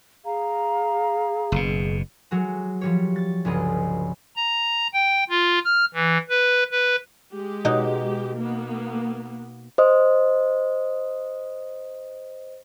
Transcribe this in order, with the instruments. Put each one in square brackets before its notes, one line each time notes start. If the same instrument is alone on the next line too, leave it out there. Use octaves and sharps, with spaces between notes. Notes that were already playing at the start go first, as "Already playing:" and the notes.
[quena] G#4 [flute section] F5 A#5
[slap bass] F#1 B2
[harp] F#3 G#3 F#4
F3 G3 C#5
A6
G1 C#2 C#3 D#5
[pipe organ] A#5
G5
F4
F6
E3
B4
B4
[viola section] G#3 G4
[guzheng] B2 D#4
[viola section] A#3 B3
[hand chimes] C5 D#5 D#6